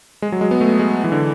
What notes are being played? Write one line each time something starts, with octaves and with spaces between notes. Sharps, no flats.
G#3
F#3
G#3
B3
A3
G#3
E3
D3